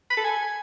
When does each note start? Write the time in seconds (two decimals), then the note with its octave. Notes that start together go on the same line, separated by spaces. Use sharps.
0.10 B5
0.17 A4
0.24 G#5